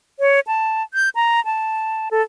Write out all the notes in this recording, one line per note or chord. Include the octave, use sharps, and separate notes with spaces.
C#5
A5
G6
A#5
A5
A4